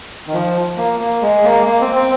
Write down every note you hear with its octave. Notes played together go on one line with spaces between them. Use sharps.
D#3
F3
A#3
A#3
G#3
A#3
A#3
C4
C4